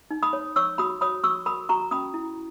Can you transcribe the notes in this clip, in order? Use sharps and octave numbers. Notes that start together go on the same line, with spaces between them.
D#4
B5 D#6
C#5
C#5 C#6 E6
F#4 B5 D#6
C#5 B5 D#6
F#4 C#6 E6
A#4 B5 D#6
F#4 A#5 C#6
C#4 B5 D#6
E4